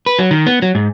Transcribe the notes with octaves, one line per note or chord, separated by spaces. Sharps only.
B4
F#3
D#3
B3
F#3
G#2